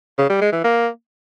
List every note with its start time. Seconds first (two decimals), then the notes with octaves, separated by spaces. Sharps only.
0.18 C#3
0.30 G3
0.41 G#3
0.52 E3
0.64 A#3